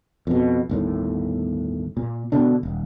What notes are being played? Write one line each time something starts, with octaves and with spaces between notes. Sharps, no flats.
F2 B2
G1 D#2 A2
A#2
B2 D3 D4
D#1